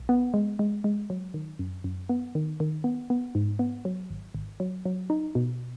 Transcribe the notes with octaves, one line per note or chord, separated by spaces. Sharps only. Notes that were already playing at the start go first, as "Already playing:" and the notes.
Already playing: B1
B3
G#3
G#3
G#3
F#3
D#3
F#2
F#2
B3
D#3
D#3
B3
B3
G#2
B3
F#3
G#1
G#1
F#3
F#3
D#4
B2